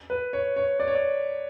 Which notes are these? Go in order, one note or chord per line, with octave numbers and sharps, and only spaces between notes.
B4
C#5
C#5
D5
C#5
D5